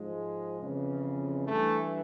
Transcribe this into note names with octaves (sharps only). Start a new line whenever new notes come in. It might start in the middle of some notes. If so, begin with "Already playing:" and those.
Already playing: G#2 F3 G#3
F2 C#3 E3
G2 E3 A3